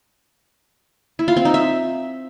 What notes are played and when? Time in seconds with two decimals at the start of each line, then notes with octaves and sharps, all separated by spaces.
1.19 E4
1.28 F4
1.37 C4
1.45 D#4
1.54 E5